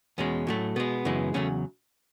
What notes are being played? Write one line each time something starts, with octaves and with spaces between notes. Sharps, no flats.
E2 B2 G#3 C#4
A2 F#3 A3
B2 G#3 B3
F#2 C#3 E3 G#3
E2 C#3 F#3 A3 C#4